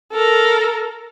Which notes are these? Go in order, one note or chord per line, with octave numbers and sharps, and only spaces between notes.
A4 A#4